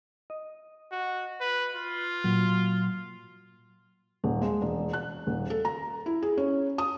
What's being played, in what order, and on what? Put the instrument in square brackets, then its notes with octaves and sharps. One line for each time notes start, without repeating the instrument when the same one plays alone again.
[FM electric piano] D#5
[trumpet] F#4
B4
F4
[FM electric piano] A#2 F#3
[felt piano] D#1
G#3
E1
F#6
D#1
A4
A#5
E4
G#4
C#4
D#6